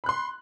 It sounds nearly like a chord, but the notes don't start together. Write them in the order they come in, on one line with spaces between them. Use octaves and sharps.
B5 F#6 C6